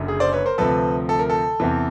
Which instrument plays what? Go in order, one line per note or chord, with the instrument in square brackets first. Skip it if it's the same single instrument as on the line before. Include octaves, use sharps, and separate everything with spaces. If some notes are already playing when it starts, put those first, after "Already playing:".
Already playing: [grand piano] F#1 F#2 D3 F#3
G#4
C5 D5
B4 C#5
A#4 C5
D2 C3 F3 A4 B4
A4
A#4
A4
E2 C3 E3